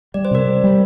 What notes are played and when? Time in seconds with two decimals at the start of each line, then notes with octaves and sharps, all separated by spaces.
0.14 G3 D5
0.25 C5
0.31 C3 A#4 D5
0.47 G3
0.64 G3